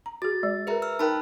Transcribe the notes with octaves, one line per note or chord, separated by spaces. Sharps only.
A#5
F#4 G#4 A6
G#3 D5
G#4 A#4 B4 E5 A#5
E6 F6
D#4 A#4 G5 A5 B5 F#6